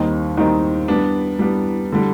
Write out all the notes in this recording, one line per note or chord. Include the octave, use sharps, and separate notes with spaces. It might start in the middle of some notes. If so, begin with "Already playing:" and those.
Already playing: D#2 D#3 G3 C4 D#4
D#2 D#3 G3 C4 D#4
G3 B3 D4
G3 B3 D4
D3 G3